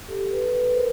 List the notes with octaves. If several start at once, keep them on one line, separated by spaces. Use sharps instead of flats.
G4 A4
A4 B4
A4 B4
A#4 C5